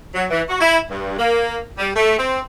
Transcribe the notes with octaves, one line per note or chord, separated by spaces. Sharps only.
F#3
E3
F#4
E4
G2
A#3
G3
A3
C4